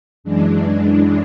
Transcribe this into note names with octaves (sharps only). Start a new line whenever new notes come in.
F#2 E3 G#3 D4